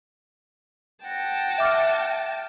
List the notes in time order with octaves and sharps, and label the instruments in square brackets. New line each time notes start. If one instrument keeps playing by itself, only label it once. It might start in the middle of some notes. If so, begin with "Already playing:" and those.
[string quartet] F#5 A#6 [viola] G5 A5
[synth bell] E5 D6 F6